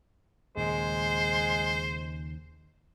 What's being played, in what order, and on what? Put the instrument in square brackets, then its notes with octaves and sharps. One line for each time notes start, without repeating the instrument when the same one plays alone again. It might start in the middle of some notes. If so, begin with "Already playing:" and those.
[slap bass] D#2 A#2 C#3 [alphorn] G#3 [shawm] C5